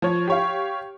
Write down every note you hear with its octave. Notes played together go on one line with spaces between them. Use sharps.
F3 C#5
G4 C#5 F5